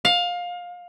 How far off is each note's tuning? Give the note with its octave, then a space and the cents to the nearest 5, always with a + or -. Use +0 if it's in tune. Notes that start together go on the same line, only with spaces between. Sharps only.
F5 +20